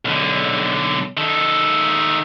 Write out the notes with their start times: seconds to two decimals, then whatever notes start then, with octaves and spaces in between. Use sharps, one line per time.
0.05 B1 D3
1.17 D#3 A4